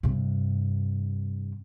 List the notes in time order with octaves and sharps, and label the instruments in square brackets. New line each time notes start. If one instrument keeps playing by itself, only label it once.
[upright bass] G2 C3